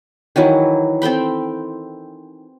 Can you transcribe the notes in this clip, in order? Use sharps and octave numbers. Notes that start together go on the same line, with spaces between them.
D#3 E3 F#3 E4
C4 A4 G5 B5